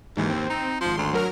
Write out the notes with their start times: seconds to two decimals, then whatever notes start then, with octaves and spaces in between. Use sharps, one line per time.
0.17 D#2 G#2 E3
0.29 C4
0.50 D#4
0.81 G#1 F3 C6
0.97 D2
1.13 F#3 A#4 F6